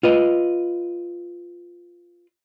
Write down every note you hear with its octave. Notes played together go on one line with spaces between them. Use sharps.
F4 B4 D#5